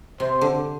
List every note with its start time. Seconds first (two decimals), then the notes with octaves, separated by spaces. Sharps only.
0.20 C3 C5
0.41 D3